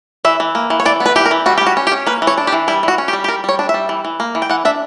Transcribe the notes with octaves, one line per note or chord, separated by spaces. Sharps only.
E3 E5
E3
A#3
E3
C#5
E3 D5
B3
B4
E3 G4
A#4
E3
G3 F#4
G4
C#4
F#4
C#4
G4
C#4
A#3 B4
E3
C#5
D4
G4
E3
G3 E4
E3 F#4
C#4
G4
G3
G4
G3 A#4
G3 C#5
D4
E5
G3
E3
E3
A#3
E3
G5
E3 F#5
D4 E5